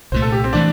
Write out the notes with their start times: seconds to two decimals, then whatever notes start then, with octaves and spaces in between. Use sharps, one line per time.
0.12 C2 A#2 A3 C5
0.22 A4
0.32 G4
0.44 C4
0.53 E3 A3 D4